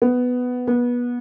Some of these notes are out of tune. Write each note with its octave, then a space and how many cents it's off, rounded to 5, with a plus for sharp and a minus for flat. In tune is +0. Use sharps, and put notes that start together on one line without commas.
B3 +5
B3 -25